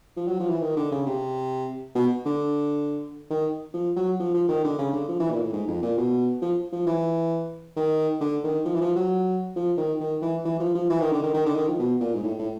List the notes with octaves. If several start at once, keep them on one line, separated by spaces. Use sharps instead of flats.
F3
F#3
F3
E3
D#3
D3
C#3
C3
B2
D3
D#3
F3
F#3
F3
F3
D#3
D3
C#3
D3
F3
E3
A#2
A2
G#2
F2
A#2
B2
F3
F3
E3
D#3
D3
D#3
F3
E3
F3
F#3
F3
D#3
D#3
E3
E3
F3
F3
E3
D#3
D3
D#3
D#3
D3
D#3
F3
B2
A#2
G#2
A2
A2